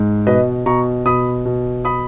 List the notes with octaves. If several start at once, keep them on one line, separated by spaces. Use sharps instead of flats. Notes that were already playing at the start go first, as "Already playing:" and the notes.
Already playing: G#2
B2 B4 D#5
B2 A#5 C#6
B2 B5 D#6
B2
B5 D#6